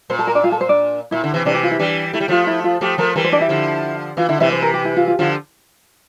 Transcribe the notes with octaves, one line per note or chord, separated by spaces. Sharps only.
A#2 C5
A4
A#4
D4 D5
F4 F5
A4
C5
D4 D5
A#2 E4 E5
D3
C3 E3
C3 E3 D4 D5
G4
F4
E4
E3 G3 D4
A3 E4
G3
F3 A3 F4
E4
F4
F3 A3 G4
F3 A3 A#4
E3 G3 A#4
C5
D4 D5
E4 E5
D3 F3
E3 F4 F5
D3 E4 E5
C3 E3 E4 E5
C5
A#4
G4
E4
F4
F4
D3 F3 F4